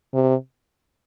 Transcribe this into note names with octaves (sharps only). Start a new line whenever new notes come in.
C3